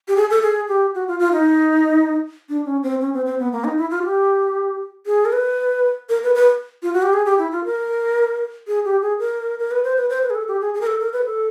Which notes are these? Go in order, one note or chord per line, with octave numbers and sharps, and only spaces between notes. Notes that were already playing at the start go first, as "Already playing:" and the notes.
G4
G#4
A4
G#4
G4
F#4
F4
F4
D#4
D4
C#4
C4
C#4
C4
C4
B3
A#3
D#4
E4
F4
G4
G#4
A#4
B4
A#4
B4
B4
F4
F#4
G4
G#4
G4
E4
F4
A#4
G#4
G4
G#4
A#4
A#4
B4
C5
B4
C5
B4
G#4
A4
G4
G#4
G#4
A#4
A4
A#4
B4
A4